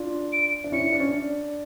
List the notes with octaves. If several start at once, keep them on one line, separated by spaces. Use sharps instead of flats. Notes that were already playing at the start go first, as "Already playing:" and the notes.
Already playing: D4 F4
D7
D4
C#4 E4 C#7
D4
C#4
D4